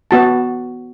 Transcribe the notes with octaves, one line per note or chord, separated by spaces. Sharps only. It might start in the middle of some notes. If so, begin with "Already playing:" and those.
B3 F#4 A5